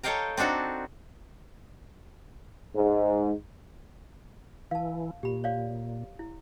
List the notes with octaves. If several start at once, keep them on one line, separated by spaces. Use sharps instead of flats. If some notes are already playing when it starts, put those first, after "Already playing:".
A4 C#5 D#5 F5 G5 A#5
C4 D4 D#4 F#4 A4
G#2
E3 F5 A5
A#2 G4 B5
C#5 D5 F5
E4